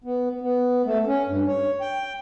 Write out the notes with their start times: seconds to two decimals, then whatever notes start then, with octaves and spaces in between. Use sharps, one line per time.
0.04 B3
0.41 B3
0.86 A3
1.07 C#4
1.28 G2
1.47 C#5
1.81 G5